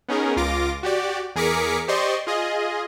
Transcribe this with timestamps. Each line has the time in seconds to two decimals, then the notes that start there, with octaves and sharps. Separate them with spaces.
0.09 B3 C#4 D#4 G#4 A#4
0.36 C#2 F4 D6 A#6
0.83 F#4 G4 D5
1.35 E2 G#4 A#4 D6 B6 C#7
1.88 G4 C5 D5 D#5 C6 C#6
2.27 F4 G#4 D#5